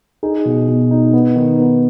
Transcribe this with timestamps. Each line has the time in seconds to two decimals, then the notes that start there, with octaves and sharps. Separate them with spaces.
0.23 D#4 G#4
0.45 B2
0.68 B2
0.91 D#4
1.13 B3
1.36 D#3
1.59 B3